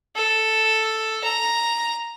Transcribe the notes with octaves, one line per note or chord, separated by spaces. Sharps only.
A4
A#5